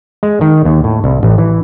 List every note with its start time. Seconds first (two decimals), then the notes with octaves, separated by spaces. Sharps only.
0.23 G#3
0.41 D#3
0.65 D#2
0.84 A2
1.04 C2
1.23 A1
1.38 E3